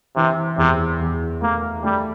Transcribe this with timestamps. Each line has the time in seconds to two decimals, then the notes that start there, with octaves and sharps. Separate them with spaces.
0.16 C3 E3
0.58 E2 C3
1.00 E2
1.42 A3 A#3
1.84 G3 A3